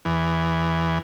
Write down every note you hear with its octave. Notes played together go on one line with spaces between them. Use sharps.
E2